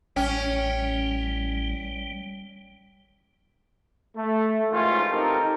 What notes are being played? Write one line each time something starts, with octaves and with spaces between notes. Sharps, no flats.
A1 G3 C#4 G5
A3
A1 G#2 D#3 E3 C#4 F4
C4 D#4 G4 A4 A#4